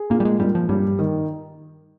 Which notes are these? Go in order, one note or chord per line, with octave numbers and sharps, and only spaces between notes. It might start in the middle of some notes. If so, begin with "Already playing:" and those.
Already playing: G#4
A#2 A#3
G3
G#3
A#2 G3
F3
G2 G3
D#3